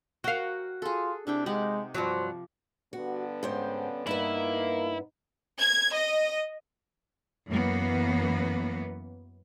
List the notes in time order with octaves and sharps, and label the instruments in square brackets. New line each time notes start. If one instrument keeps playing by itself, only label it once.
[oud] F#4 F5 [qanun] A#4 G5
[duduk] F4 [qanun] G#4 A4
[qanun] C3 E4 G5 [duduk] D4
[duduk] G#3 [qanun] D#4 G4 F#5
[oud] G2 F#3 [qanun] F3 D6 [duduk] C5
[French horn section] G2 D3 B3 [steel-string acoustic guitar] F#4
[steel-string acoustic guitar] G#2 C5 G5 [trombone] C#4
[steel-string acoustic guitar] G2 B3 B4 [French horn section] A#3 [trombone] D#4 [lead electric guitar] E4
[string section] G#6
D#5
[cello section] F#2 E3 A#3 B3